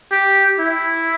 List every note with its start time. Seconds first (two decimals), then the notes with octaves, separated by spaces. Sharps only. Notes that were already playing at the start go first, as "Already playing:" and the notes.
0.12 G4
0.59 E4